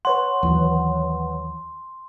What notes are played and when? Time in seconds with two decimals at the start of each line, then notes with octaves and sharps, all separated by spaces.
0.05 B4 C#5 F#5 C6
0.43 D#2 E3 F#3